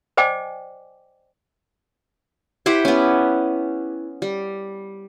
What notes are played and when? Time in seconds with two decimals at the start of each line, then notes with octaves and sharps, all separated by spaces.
0.17 C5 D5 D#5 G5 G#5 D6
2.66 E4 G4 C5 F#5
2.85 B3 C#4
4.22 G3